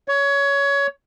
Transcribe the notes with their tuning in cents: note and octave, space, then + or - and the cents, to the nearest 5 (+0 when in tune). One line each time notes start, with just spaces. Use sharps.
C#5 +20